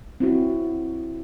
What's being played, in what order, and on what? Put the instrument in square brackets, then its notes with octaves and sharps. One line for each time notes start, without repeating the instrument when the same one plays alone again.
[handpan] C4 E4 F#4